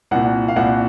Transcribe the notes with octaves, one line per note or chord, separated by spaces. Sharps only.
C2 A#2 F#5
F5
C2 A#2 F#5